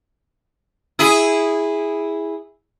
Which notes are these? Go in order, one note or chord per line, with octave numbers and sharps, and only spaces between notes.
E4 G#4